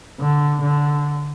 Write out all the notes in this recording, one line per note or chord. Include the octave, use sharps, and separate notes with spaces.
D3
D3